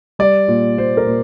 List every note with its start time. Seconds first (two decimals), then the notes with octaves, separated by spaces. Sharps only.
0.19 G3 D5
0.48 A#2
0.78 A#2 C5
0.97 A#4
1.07 A#2